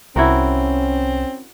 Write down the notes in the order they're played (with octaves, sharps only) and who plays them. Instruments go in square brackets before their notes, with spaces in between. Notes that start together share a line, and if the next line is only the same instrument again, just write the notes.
[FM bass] C2 [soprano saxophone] C4 [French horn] C#4 [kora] E4 F#4 A#4